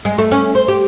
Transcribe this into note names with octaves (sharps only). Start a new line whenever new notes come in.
G#3
A3
C#4
C5
G4